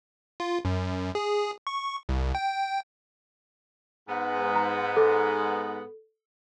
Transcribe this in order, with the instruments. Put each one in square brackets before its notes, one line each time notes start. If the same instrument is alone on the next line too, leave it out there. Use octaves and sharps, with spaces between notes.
[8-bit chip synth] F4
F#2
G#4
C#6
C2
G5
[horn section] G#2 B3
[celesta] A#5
A4